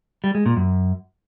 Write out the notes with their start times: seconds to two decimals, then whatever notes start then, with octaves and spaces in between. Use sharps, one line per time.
0.24 G3
0.35 G#3
0.46 A#2
0.57 F#2